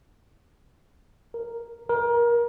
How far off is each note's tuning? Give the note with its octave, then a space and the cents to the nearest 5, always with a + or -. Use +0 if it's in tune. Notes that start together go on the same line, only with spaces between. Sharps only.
A#4 +0
A#4 +25